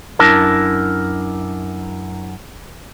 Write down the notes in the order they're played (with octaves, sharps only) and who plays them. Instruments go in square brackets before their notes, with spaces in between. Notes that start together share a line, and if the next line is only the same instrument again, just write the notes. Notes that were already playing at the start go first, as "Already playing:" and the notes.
[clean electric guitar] F#2 D4 E4 A#4 A5